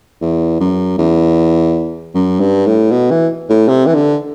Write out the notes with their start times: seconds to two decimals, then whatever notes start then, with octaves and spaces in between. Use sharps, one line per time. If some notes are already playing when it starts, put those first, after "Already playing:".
0.22 E2
0.60 F#2
0.98 E2
2.14 F#2
2.40 G2
2.66 A2
2.91 B2
3.11 E3
3.49 A2
3.68 C3
3.86 E3
3.95 D3